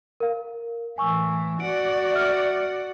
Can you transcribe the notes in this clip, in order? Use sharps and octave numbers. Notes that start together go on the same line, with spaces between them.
A#4 F5
A2 E3 G#5 C#6 E6
F#4 D5 F#5 D7
E5 F6